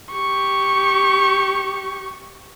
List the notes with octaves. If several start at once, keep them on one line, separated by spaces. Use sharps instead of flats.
G4 C#6